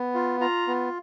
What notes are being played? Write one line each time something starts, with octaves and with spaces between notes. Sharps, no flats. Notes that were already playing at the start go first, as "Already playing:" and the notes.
Already playing: B3
F4
F4 A#5
B3